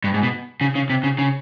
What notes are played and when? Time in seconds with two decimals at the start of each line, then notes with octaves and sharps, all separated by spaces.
0.04 G2
0.14 G#2
0.23 B2
0.61 C#3
0.75 C#3
0.90 C3
1.04 C#3
1.19 C#3